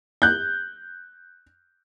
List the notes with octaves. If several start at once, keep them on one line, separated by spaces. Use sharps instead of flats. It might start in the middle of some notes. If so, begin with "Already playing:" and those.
F#6 G6